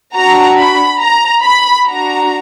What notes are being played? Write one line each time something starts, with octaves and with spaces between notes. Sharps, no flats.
D4 F#4 A#5
B5
A#5
B5
D4 F#4 A#5